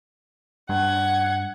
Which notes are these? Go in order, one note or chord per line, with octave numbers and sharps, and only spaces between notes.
G2 F#5 G#6